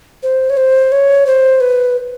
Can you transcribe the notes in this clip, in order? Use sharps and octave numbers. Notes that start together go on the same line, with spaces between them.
C5
C#5
C5
C#5
C5
B4